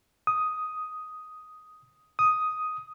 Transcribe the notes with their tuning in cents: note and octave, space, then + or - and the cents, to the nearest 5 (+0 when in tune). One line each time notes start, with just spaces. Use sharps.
D#6 +5
D#6 +5